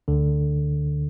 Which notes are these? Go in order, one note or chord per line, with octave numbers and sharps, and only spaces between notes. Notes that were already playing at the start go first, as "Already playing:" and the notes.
D2 D3